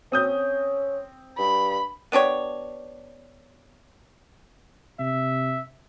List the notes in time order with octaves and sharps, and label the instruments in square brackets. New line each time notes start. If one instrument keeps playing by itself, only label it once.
[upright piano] C4 D#6 G6 [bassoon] C#4
[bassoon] G2 [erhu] B5
[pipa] B3 D4 G4 C#5
[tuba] C3 [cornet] E5